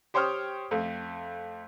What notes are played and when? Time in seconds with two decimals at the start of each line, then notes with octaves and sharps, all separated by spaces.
0.14 G4 C5 C#5 G5 D#6 F6
0.71 F2 A3